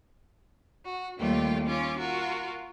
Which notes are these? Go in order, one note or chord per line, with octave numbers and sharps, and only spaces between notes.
F#4
D#2 D#3 G3 A3 F4 G5
C#4 F4 D6
F4 F#4 A#4